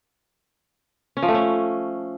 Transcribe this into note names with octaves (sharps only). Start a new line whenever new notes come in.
C#4
F3
A3
C#4